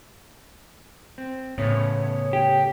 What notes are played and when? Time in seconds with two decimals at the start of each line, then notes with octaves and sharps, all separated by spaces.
1.18 C4
1.58 A2 C#3 B3 C#4 C#5
2.33 G4